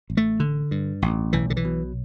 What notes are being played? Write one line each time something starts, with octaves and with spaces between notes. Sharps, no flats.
A1
A3
D3
G2
A1
B1 E3
D3
E3
B2